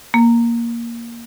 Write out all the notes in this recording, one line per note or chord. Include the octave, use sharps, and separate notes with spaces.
A#3